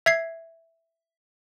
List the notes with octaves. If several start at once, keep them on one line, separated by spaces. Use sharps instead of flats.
E5 G#6 C7